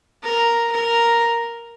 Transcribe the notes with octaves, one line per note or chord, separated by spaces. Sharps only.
A#4
A#4